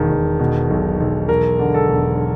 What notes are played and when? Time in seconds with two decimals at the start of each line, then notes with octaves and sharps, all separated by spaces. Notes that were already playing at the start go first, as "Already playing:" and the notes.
Already playing: E1 D#3
0.11 E1
0.39 B2
0.70 B1
1.00 B1
1.29 E1 A#4
1.59 D3
1.74 A4
1.88 E1